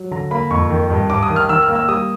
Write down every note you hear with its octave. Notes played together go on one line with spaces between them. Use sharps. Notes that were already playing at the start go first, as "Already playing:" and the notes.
Already playing: F#3
D3 A#5
A#3 B5
F2 C#6
D#3
G2
G2 D6
D#6
D#3
F6
D#3 E6
F6
A#3
E6
G3 D#6